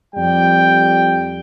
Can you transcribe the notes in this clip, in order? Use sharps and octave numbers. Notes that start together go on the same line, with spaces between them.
F2 G3 G5